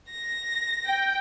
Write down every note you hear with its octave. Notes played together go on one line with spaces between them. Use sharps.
A#6
G5